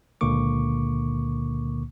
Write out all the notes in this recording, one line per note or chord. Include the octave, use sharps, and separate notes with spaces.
C#2 A#2 D3 A#3 C#6 D6